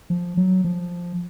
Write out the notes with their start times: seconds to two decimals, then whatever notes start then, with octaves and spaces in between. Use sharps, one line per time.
0.10 F3
0.37 F#3
0.64 F3